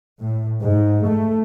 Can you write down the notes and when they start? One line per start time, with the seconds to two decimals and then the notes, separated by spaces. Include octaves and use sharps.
0.20 A2
0.61 G#2
1.07 A3